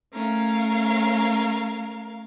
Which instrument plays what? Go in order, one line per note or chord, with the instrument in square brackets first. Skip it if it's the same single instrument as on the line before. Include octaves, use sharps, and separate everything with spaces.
[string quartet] A3 C#4 A#4 F5